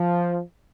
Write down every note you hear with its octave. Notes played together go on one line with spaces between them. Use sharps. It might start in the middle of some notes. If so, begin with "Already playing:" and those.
Already playing: F3